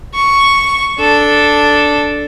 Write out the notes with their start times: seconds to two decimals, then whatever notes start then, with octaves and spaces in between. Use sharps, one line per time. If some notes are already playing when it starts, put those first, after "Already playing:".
0.15 C#6
0.99 D4 A4